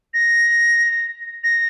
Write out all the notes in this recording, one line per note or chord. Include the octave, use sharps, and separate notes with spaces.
A#6
A#6